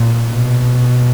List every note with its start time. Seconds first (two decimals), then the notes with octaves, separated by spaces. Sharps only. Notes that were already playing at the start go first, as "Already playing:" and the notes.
Already playing: A#2
0.28 B2